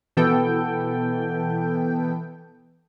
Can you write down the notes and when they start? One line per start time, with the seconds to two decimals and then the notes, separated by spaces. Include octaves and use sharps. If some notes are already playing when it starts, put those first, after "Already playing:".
0.17 B2 E3 B3 A4 G5